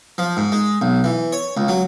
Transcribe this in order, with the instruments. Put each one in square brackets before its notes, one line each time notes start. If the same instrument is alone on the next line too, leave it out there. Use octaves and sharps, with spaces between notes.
[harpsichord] F3
G#2
G#3
B1
E3
C#5
C#2
F#3